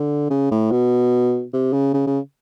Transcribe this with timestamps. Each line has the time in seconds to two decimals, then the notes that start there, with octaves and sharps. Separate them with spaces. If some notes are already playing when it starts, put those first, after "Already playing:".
Already playing: D3
0.30 C#3
0.51 A2
0.71 B2
1.53 C3
1.73 C#3
1.94 C#3
2.07 C#3